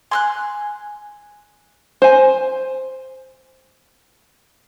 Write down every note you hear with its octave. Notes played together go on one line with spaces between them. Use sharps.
G#5 C6 F6 F#6
C5 G#5